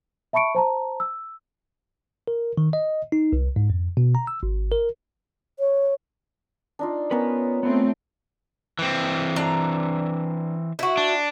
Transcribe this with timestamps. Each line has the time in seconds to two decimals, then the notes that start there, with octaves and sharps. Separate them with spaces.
0.33 E5 A5 B5 C#6 C#7 D7
0.55 C5 A5 A#5
1.00 E6
2.28 A#4
2.58 D#3
2.73 D#5
3.12 D#4
3.33 C2
3.56 G#2
3.70 F2
3.97 B2
4.15 A#5
4.27 E6
4.43 G#1
4.72 A#4
5.59 C#5
6.79 D4 D#4 F4
7.11 B3 C#4 A#4 B4
7.63 A3 B3 C4
8.79 E3 C4
9.36 D4 A#5
10.79 E4 F#4
10.97 D4